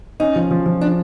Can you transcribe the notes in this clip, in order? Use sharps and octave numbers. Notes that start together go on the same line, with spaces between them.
C#4 D#4
F3
F3
F3
D4